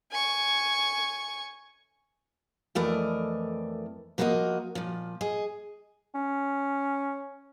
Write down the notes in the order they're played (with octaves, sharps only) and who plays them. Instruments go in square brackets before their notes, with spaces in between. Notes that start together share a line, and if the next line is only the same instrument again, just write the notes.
[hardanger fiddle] G#5 C#6
[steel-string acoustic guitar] F2 E3 A3 A#4 D5 D#5
F3 A#3 F#4 G#4 A#4 D#5
A#2 F3
G#4 D#5
[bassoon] C#4